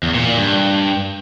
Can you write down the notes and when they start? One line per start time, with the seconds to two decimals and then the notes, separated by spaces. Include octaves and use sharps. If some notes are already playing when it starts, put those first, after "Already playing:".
0.03 E2
0.15 A#2
0.26 A#2
0.38 G2